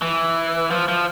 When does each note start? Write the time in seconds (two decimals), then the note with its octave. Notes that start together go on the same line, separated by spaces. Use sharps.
0.02 E3
0.71 F3
0.88 F3